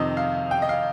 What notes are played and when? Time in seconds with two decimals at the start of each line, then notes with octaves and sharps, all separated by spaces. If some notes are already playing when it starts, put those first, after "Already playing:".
Already playing: F2 C3 D#3 D#5
0.17 F5
0.51 G5
0.62 D#5
0.69 F5